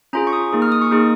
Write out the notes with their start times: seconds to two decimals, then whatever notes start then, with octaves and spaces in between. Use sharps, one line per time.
0.13 C#4 F4 G#4 A#5
0.27 C#6
0.33 D#6
0.53 A#3 D#4 G#4
0.62 F6
0.72 D#6
0.82 C#6
0.91 A#3 D#4 G#4